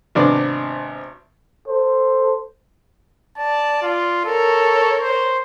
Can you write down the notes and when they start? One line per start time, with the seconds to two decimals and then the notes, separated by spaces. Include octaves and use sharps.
0.15 G#1 C3 B3 D4 D5
1.68 A4 C5
3.37 D5 A5
3.82 F4
4.25 A4 A#4 C#5
5.02 C5